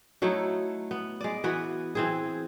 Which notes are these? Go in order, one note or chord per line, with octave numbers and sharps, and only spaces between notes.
F#3 A3 D#4 E4
B3
G#3 D5
E3 B3 F#4 B4
E3 C4 G#4